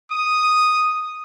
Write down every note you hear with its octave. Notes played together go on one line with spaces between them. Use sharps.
D#6